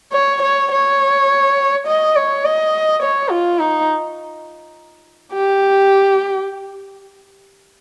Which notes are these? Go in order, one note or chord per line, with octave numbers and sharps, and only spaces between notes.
C#5
C#5
C#5
D#5
C#5
D#5
C#5
F4
D#4
G4